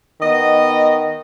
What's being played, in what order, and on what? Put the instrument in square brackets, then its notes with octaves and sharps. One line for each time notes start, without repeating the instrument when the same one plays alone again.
[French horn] D#3 [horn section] B3 D#5